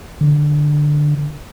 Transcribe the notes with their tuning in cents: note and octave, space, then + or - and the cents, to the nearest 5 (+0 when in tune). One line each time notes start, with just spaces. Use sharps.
D3 +10